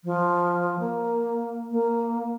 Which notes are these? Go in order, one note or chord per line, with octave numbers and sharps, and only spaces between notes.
F3
A#3
A#3